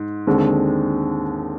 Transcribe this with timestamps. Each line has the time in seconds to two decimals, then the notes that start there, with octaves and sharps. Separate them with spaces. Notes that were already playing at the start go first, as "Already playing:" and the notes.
Already playing: G#2
0.27 D#2 D3 G#3 C4